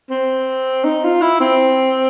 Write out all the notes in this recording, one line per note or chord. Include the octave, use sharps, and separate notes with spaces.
C4
D#4
F4
E4
C4